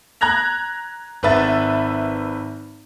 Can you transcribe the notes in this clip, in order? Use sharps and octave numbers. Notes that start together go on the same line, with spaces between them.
A#5 F#6 G#6 A#6 F7
G#1 B4 E5 A6